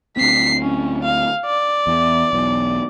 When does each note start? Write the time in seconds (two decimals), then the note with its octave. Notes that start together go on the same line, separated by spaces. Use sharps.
0.17 D2 C4 B6 C7
0.62 C#4
1.04 F5
1.46 D5
1.87 E2
2.33 B1 E2